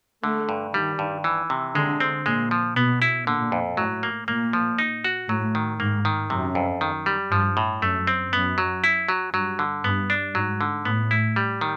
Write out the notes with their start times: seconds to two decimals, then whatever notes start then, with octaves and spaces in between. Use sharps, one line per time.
0.23 D3 A3
0.49 G2
0.74 D#3 G3
0.99 G2
1.24 E3
1.50 C3
1.75 D3 G#3
2.00 C4
2.25 A#2 G#3
2.51 F3
2.76 B2 B3
3.02 E4
3.27 A#2 D3
3.52 F2
3.77 A2 F#3
4.03 A#3
4.28 A#2 A#3
4.53 F3
4.79 D#4
5.04 F#4
5.29 A2 F#3
5.55 D#3
5.80 G#2 A#3
6.05 D#3
6.30 F#2 C3
6.55 F2
6.81 D#3
7.06 G3
7.31 G2 F3
7.57 A2
7.81 F#2 A3
8.07 C4
8.32 F#2 B3
8.58 F#3
8.84 E4
9.08 F#3
9.34 G2 F#3
9.59 D3
9.84 G2 B3
10.10 D4
10.35 G#2 F#3
10.61 D3
10.85 A2 B3
11.11 E4
11.36 G3
11.61 D#3